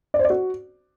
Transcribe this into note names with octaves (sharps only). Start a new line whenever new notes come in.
D5
C5
D5
F#4